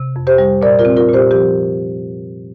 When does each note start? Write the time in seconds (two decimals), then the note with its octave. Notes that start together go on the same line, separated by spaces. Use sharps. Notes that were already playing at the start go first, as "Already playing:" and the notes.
Already playing: C3
0.16 F2
0.27 G4 C5
0.38 G3
0.62 A#2 A#4 D5
0.79 F4 A#4
0.85 C4
0.96 F4 A#4
1.08 A#2
1.13 G4 C5
1.31 F3 G4